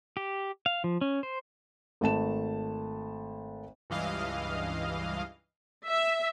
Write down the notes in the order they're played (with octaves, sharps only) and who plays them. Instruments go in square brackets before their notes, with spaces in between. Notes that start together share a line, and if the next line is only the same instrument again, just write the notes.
[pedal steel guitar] G4
F5
F3
C#4
C5
[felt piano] G#1 A3 A5 E7
[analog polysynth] C#2 G2 E3 D#5 F5
[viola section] E5